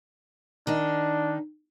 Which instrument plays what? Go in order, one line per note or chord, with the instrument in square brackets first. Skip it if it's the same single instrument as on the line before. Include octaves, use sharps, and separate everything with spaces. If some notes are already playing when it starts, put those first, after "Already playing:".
[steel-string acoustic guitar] D#3 D#4 [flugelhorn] D4